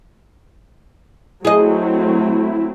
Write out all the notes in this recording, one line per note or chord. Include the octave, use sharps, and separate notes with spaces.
F#3 A3 C4 E4 G#4 D#5